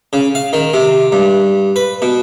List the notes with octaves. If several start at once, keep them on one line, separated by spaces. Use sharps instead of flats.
C#3
F5
D#3
C3
G2
B4
B2